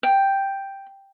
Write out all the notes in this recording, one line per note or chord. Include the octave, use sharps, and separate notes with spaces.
G5